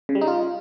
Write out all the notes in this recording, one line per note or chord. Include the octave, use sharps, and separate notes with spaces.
C#3
G3
D#4
F4